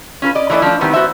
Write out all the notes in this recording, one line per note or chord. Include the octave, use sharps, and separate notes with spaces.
C#4 F4 A#4 B4
D5 D#5
E3 A3 E4 C5 D5 D#5
F3 A3 D4
D#3 E3 G3 B3 C4
B3 F#4 C5 E5